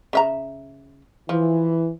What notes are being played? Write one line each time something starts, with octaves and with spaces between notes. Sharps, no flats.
C#3 E5 A#5
E3 F3